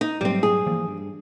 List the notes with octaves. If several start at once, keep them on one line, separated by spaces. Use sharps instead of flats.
D#4
G#2 F#3 G3 A3 C4
G#4
E3 F3 A#3
G2